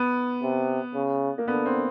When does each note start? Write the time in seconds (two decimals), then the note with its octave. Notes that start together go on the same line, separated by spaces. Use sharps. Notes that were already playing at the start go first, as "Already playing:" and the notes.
Already playing: B3
0.43 C3
0.94 C#3
1.38 A#3
1.48 D3 B3
1.65 C4